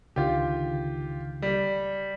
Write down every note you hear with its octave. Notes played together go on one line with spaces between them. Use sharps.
C#2 D3 D#3 F4 G4
G3